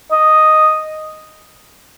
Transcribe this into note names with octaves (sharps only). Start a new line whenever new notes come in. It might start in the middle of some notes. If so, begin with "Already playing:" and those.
D#5